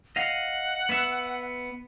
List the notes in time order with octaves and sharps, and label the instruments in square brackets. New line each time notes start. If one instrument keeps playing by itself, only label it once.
[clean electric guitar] D#5 F5 [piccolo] F#5
[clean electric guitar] B3 E5